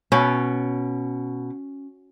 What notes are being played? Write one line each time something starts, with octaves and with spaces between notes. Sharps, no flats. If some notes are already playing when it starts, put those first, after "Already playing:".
B2 C#4